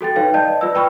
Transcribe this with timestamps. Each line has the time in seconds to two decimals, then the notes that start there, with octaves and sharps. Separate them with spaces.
0.01 F#4 A4 G5 A6
0.16 D#4 B4 C#5 F5 G5
0.34 D5 D#5 A5 G6
0.61 F4 B4 D5 E6
0.75 B4 G5 B5 C#6 F6